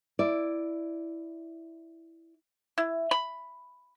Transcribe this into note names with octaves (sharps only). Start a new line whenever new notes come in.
E4 D5
E4
B5